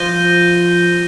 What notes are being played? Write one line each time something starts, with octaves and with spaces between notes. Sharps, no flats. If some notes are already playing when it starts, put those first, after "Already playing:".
Already playing: F3 G6 A#6 D#7 G7